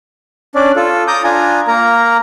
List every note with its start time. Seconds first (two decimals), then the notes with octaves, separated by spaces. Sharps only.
0.55 C#4 D4 D5
0.76 F4 A4
1.08 A#5 D6 D#6 G6
1.24 D4 F4 G#5 A#5
1.67 A#3 A#4 A#5